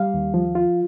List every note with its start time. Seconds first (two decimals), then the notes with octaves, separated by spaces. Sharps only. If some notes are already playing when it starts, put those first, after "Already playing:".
Already playing: G3 F5
0.14 D#2
0.34 F3
0.55 F4